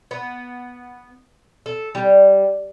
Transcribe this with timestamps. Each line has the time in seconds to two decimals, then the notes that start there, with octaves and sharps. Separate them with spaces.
0.11 B3
1.66 A4
1.95 G3